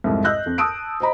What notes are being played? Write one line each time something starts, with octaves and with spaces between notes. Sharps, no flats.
C2 F2 G#2
D#5 E6 F#6 G6 A#6
F2
A5 D#6 E6 D7
C5 D#5 A#5 B5